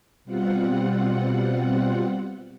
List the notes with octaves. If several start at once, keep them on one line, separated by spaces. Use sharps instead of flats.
B2 G3 C4 F4 F#5